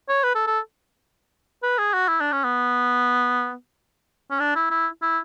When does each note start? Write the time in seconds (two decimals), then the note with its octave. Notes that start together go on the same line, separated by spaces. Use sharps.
0.09 C#5
0.24 B4
0.36 A4
0.47 A4
1.63 B4
1.79 G#4
1.94 F#4
2.09 E4
2.20 D4
2.32 C#4
2.44 B3
4.31 C#4
4.40 D4
4.56 E4
4.71 E4
5.02 E4